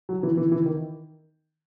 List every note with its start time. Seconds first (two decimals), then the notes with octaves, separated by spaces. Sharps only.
0.09 F#3
0.23 E3
0.37 E3
0.52 E3
0.66 D#3